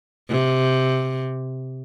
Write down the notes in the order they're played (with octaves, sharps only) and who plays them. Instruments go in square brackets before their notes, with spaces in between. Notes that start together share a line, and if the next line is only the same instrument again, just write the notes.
[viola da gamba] C3